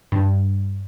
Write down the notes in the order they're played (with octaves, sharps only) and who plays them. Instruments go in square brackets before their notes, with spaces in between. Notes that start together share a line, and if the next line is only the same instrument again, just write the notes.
[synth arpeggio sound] G2